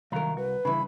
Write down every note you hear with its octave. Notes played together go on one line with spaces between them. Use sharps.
C2 D#3 F#3 A#4 F5 A#5
F#4 B4
G2 C#3 E3 B5